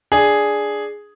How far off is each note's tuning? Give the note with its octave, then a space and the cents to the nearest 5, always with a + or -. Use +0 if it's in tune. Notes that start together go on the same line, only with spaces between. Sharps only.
D4 +0 G#4 +0